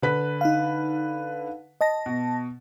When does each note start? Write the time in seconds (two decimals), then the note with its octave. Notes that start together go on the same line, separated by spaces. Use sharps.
0.02 D3 B4 B6
0.41 D#4 F5
1.81 D#5 A5 A#6
2.06 B2